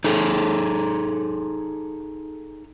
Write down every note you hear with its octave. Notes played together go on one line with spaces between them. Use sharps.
D#4 G#4 A4